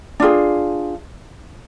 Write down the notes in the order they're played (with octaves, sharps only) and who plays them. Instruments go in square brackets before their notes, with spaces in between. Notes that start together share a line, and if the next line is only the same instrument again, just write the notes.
[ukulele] D4 F4 G#4